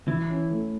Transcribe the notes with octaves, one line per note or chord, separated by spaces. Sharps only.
E3 E4
C#4
A3